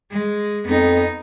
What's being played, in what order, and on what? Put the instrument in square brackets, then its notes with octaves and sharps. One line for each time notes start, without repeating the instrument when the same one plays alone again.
[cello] G#3
[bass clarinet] F2 [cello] B3 D#4